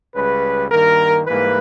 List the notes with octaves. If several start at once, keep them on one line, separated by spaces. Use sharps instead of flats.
C#2 C#3 G3 B4
G2 D#3 A#3 A#4
G#2 E3 G3 A#3 B4